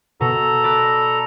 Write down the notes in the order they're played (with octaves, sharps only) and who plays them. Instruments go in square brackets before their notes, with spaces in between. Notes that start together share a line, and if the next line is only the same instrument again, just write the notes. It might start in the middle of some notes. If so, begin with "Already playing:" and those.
[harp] B2 [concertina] A4 A#5
[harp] D5 B5 F#6